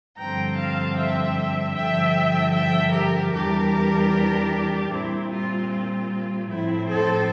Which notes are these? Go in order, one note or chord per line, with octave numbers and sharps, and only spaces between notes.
G2 D3 F3 C4 G5 A#5
F5 A5
E5 G5
G2 D3 F3 E5 G5
E5 G5
G4 A#4
E2 E3 G3 D4 G4 A#4
A#2 G3 C4 E4
F4
F4
A2 F3 C4 E4
A4 C5